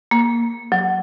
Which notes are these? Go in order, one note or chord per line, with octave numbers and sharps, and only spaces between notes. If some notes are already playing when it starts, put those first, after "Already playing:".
A#3
F#3